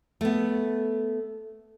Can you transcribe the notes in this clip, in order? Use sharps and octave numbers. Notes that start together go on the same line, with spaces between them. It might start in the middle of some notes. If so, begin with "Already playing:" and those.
A3 B3